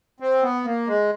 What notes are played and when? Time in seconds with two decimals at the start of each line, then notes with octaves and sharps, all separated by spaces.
0.20 C4
0.42 B3
0.65 A#3
0.87 G#3